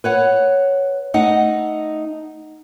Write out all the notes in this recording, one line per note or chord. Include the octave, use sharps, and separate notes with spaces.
B4 C#5 F#5
A3 D#4 D#5 F#5